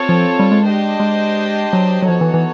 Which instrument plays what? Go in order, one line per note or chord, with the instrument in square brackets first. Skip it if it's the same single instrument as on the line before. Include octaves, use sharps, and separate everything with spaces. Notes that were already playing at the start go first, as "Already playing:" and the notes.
Already playing: [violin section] C4 F4 A4 C#5
[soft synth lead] F3
G3
G#3
[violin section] D4 G4 C5 D#5
[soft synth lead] G#3
F#3
F#3
[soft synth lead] F3 [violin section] B3 D#4 F#4 A4 C#5
[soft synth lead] E3
E3